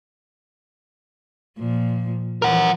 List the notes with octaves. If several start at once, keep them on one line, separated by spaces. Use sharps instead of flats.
A#2 F3
E3 F3 A#4 F#5